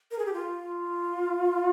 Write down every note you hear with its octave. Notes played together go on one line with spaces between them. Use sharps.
A#4
G#4
G4
F4